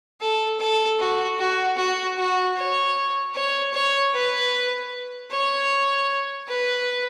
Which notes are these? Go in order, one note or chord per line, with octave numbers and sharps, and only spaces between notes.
A4
A4
F#4
F#4
F#4
F#4
C#5
C#5
C#5
B4
C#5
B4